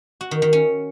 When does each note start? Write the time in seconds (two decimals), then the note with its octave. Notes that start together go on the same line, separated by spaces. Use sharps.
0.21 F#4
0.31 D#3
0.42 D#3
0.53 C#4